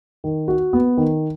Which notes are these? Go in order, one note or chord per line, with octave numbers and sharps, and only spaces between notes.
D#3
F#4
B3
D#3